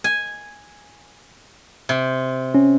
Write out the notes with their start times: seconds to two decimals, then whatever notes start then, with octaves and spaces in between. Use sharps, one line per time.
0.04 G#5
1.89 C3
2.55 C#4